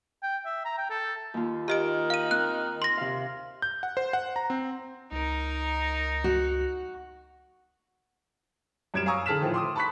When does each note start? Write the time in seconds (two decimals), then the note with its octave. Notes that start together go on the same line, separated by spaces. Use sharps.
0.23 G5
0.46 E5
0.65 A#5
0.78 G5
0.90 A4
1.34 D#2 F4
1.68 D#3 G4 D#5 D7
2.10 F5 D#7
2.31 C4 F#6
2.82 C6 A#6
2.97 C3 F5
3.62 G6
3.83 F#5
3.97 C5
4.13 F#5
4.36 A#5
4.50 C4
5.12 C#2 D#4 A#4
6.24 F#4
8.94 F#2 G3 G#6 D7 E7
9.06 F5 G#5 A#5 C#6 D#6 E6
9.26 D3 G#4 A5 F6 B6 E7
9.41 A2 D#3 F3 A3
9.54 C6 D6 D#6
9.76 A5 B5 C#6 F#6 B6